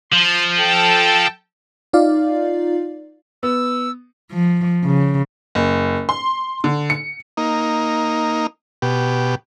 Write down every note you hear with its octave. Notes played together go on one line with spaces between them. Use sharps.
F3 C6
A4 G5 A5
D#4 F4 D5 F5
B3 E6
F3
C#3
F#1
C6
D3
C#7
A#3 D#4
B2 G4